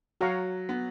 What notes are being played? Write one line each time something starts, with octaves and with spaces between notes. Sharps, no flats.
F#3 F#4 C#5 F5 A#5 C#6
B3